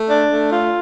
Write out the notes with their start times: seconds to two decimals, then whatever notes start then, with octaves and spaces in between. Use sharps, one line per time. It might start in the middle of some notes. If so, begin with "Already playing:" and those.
Already playing: A3
0.09 D4
0.30 A3
0.52 F4